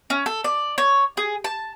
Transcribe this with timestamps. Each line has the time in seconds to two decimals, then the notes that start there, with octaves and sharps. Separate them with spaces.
0.10 C#4
0.26 A4
0.44 D5
0.78 C#5
1.17 G#4
1.44 A5